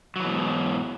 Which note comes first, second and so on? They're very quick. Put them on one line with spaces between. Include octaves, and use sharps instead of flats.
F#3 E3 B2 G#2